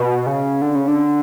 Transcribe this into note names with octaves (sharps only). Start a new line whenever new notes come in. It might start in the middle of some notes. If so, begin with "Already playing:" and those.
Already playing: B2
C#3
D3
C#3
D3